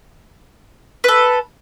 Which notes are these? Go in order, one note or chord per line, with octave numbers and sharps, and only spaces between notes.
A4 B4